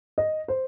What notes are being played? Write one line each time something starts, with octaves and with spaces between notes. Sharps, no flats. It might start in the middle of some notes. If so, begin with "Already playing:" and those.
D#5
C5